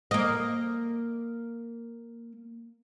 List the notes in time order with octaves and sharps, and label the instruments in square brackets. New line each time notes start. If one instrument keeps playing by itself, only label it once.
[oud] A#3 D#5